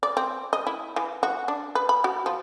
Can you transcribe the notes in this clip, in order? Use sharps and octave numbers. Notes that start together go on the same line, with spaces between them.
D5
C4
D#5
E4
E3
F#4
D4
B4
B5
F#4
F3